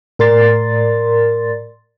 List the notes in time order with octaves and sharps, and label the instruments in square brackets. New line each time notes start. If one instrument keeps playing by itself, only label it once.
[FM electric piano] A2 A#4 D5 C6 A6